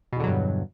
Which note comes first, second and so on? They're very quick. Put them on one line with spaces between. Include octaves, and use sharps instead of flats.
B2 E2 D3 F#3 G2